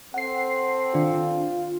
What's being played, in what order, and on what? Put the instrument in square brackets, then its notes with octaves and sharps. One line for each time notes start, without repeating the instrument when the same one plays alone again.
[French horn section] C4 A4 [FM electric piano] F#5 C7
[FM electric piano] D#3 D4 [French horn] F4